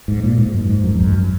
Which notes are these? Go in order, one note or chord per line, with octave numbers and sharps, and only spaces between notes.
G#2
A#2
G#2
F#2
G#2
F#2
E2
F#2